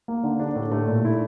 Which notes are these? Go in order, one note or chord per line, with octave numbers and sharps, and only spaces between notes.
A#3
D3
D4
A2
A3
A#2
E4